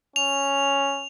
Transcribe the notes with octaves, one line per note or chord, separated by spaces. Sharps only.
C#4 F7